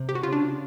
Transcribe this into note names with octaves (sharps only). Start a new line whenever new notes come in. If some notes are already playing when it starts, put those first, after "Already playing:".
Already playing: C3
G4
F#4
C#3 F4
D4